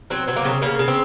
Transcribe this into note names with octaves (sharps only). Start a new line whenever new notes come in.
F#3 C4
F#3 C4
A#3
C#3 C4
C#3 A#3
C#3
C4